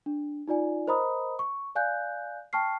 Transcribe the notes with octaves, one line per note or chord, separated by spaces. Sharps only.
D4
D#4 F4 D5 G#5
A#4 C5 D#5 A#5 B5 D#6
C#6
D5 F5 G#5 F#6 G6
G5 A5 C#6 F6 C7